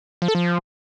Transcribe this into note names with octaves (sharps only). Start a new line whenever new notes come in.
F3
A4
F3